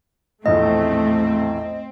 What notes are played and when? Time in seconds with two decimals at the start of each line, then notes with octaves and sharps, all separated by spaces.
0.46 A#1 E2 A2 A3 C4 D#5